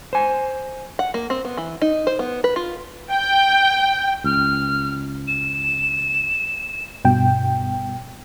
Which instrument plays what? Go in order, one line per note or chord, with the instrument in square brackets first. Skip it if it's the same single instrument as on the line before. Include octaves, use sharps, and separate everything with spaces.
[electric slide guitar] C5 G#5
[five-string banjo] F#5
A#3
C4
B3
E3
D#4
C5
B3
B4
F4
[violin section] G5
[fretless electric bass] C#2 [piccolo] F6
[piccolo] E7
[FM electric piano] G2 B2 G5